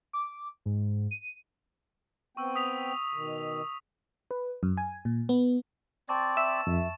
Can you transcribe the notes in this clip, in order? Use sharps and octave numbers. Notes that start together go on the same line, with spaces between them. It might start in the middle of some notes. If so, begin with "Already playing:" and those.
D6
G#2
D#7
B3 C4 G5 C#6 E6
D#6 B6 F7
B2 D#3
B4
F#2
G#5
A#2
B3
C4 D5 A5 C#6 A6
E5 E7
F2